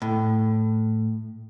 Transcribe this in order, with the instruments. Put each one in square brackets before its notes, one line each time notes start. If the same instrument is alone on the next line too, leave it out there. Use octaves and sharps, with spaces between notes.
[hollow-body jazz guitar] A2